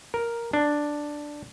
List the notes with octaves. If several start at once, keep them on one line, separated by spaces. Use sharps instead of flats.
A#4
D4